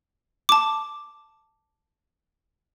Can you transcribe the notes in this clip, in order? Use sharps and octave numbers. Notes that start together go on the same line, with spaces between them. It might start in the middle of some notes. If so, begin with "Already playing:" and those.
A5 D6